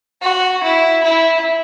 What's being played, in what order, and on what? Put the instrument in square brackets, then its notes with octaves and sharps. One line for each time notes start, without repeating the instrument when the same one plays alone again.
[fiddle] F#4
E4
E4